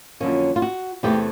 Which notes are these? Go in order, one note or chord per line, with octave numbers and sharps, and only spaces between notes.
F2 D3 F#3 A#3 C#4
F4
F#4
E2 C3 E3 A3 G4